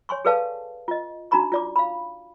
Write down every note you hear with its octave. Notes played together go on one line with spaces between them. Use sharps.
C#5 G#5 C6 C#6
G#4 A4 B4 D5 F5 A5
F4 D#5
D4 D#4 F#4 A#5 B5 C#6
F4 D5 D6
F5 B5